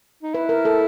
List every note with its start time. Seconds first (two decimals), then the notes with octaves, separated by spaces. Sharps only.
0.23 D#4
0.34 E4 B4
0.49 A#4
0.65 A4